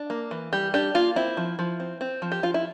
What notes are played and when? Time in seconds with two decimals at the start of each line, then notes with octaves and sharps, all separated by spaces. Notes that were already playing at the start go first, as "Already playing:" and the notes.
Already playing: D4
0.10 A#3
0.31 E3
0.53 G3 G4
0.74 D4 G4
0.94 A#3 F4
1.16 C4 E4
1.37 F3
1.59 F3
1.80 C4
2.01 C4
2.22 F3
2.32 G4
2.43 F3 F4
2.54 E4